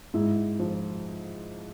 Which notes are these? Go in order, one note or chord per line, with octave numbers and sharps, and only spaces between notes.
G#2 E4
F3